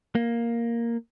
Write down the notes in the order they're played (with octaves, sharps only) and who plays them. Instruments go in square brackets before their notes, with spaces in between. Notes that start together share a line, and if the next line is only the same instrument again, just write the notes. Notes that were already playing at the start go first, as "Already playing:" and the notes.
[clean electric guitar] A#3